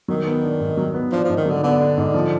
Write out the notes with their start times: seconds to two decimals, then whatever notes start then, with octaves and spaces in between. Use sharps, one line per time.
0.08 D#3 F#3
0.27 B3
0.43 D4
0.60 G#2
0.77 F#3
0.94 B3
1.11 F3 D4
1.24 G#2 F3
1.37 D#3
1.46 D3 F#3
1.63 D3 B3
1.80 D4
1.97 G#2
2.14 F3